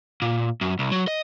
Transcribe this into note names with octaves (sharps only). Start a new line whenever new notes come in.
A#2
F#2
C2
F#3
D#5